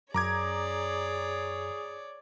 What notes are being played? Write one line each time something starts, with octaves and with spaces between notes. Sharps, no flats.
F#2 G#4 C#5 D5 A#5 D6 G#6